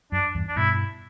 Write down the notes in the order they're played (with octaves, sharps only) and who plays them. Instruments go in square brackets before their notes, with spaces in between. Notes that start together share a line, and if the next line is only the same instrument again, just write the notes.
[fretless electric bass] F#2 [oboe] D4
[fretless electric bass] E2 G2
[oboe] D4
[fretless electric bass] G2 B2 [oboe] E4